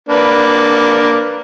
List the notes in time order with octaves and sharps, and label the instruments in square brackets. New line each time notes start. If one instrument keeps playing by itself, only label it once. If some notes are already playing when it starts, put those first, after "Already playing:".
[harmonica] A#3 D4 B4